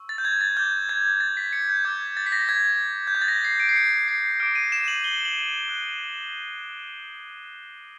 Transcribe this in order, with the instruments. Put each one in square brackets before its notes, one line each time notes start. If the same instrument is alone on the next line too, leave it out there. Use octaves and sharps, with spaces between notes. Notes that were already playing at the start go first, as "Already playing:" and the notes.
Already playing: [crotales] C#6 E6
A6
G6
G#6
A6
D6 F6 G6
G#6
A6
B6
C#7
G6
D6 F6 G#6
A6
B6
A#6
G#6
G6
D#6 F#6 G#6
A6
A#6
C7
D7
C7
C#7
C7
D6 F6 D7
D#7
E7
F#7
G7
F#7
D#6 F#6